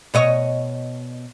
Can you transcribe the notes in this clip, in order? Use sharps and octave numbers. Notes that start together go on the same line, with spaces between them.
B2 C#5 D#5